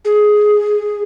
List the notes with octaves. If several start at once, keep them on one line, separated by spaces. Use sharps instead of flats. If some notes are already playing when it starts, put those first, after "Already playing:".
G#4